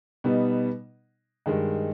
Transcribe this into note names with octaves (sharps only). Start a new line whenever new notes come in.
B2 G3 B3 D#4
G2 D#3 G#3